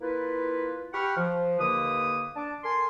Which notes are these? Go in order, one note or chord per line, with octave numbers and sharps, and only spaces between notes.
A#3 E4 F4 B4
G4 F#5 G5 B5 C#6 F6
F3
D#2 D3 A#3 B4 D#6
D4 A5 D6
A4 A#4 G#5 C6